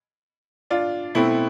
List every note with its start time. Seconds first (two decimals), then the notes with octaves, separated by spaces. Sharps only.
0.70 D4 F4
1.15 B2 A3 C4 E4